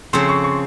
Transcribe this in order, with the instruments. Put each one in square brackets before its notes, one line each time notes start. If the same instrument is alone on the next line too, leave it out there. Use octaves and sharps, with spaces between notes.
[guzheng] C#3 F3 C4 [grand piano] C6
[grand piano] C#6
C#6